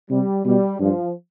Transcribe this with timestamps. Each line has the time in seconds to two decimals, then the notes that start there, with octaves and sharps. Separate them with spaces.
0.10 C3 G3
0.45 B2 G3
0.80 G2 F3